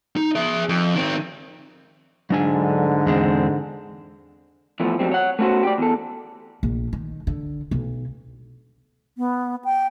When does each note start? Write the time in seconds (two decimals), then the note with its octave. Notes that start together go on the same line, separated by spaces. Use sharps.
0.17 D#4
0.35 G#4 E5
0.69 F2
0.95 D#3 C4
2.30 G#2 D3 F#3 D4 G#5
3.07 E2 G#3 C4
4.80 E3 F3 A3 B3
4.99 F2 F#3 G3 C4
5.11 C#5 F#5
5.39 A3 B3 C#4 F#4 C5
5.63 G4 D5
5.78 E2 A4
6.63 A#1
6.93 D#3
7.27 D3
7.71 B1
9.18 B3
9.65 G5